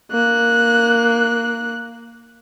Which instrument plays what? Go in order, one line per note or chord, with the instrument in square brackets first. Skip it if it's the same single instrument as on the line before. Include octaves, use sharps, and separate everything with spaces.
[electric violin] A#3 F#6